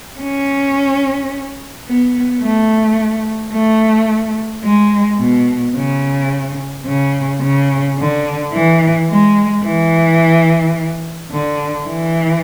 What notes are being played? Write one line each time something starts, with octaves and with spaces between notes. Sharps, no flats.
C#4
B3
A3
A3
G#3
B2
C#3
C#3
C#3
D3
E3
G#3
E3
D3
E3